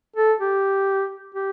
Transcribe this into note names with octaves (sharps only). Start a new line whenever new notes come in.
A4
G4
G4